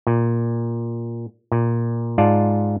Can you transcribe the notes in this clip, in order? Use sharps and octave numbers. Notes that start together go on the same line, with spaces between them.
A#2
A#2
G#2 F4 D5 A5